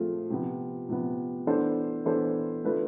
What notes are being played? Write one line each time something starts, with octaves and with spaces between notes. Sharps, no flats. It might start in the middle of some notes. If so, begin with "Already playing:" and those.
Already playing: F3 A3 C4 F4 G#4
C3 F3 B3
C3 F3 B3
E3 B3 D4 A4 C5
E3 B3 D4 A4 C5
D3 A3 D4 F4 B4